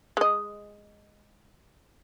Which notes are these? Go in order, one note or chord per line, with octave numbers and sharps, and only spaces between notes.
G#3 D#5